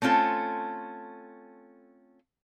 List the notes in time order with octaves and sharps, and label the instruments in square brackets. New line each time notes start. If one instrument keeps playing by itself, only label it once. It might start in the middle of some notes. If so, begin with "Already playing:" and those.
[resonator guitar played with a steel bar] A3 C4 C#4 F4 A4